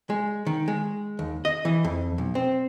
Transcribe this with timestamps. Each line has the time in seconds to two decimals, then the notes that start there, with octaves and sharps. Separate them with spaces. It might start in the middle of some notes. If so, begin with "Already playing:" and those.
0.10 G#3
0.46 D#3
0.68 G#3
1.19 D#2
1.45 D#5
1.65 E3
1.85 F2
2.18 B1
2.35 C4